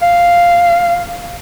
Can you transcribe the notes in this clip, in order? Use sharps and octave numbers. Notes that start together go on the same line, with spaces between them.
F5